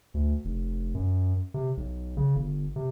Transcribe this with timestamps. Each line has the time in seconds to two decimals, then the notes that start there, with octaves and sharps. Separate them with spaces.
0.14 D2
0.45 F1
0.94 F#2
1.54 C3
1.77 B1
2.17 C#3
2.36 G1
2.76 C3